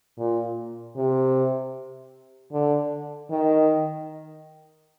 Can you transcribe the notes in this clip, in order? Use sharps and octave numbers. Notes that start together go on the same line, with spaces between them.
A#2
C3
D3
D#3